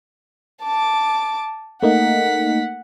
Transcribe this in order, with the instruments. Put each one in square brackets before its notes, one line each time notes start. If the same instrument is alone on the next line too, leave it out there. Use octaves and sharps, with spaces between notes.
[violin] A5 D6
[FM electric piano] A3 A#3 D#4 [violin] F#5 B6